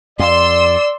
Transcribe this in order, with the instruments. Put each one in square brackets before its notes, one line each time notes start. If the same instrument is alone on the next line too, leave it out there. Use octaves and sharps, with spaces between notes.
[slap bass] F2 [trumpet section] D5 [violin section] C6 E6